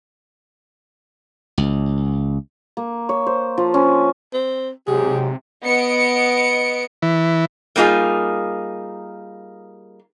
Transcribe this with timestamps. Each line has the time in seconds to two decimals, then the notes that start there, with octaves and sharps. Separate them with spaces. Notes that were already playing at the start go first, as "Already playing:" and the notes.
1.58 C#2
2.77 A#3
3.09 C#5
3.26 C5
3.58 F3
3.74 C#4
4.34 C4
4.87 G#2 C3 F#3 G4 G#4
5.64 B3 D#5 C#7 D7
7.02 E3
7.76 G3 A#3 D#4 F4 G#4